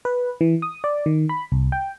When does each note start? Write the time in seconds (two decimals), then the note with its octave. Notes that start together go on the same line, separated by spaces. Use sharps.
0.05 B4
0.41 E3
0.62 D#6
0.84 D5
1.06 D#3
1.29 B5
1.52 C2
1.72 G5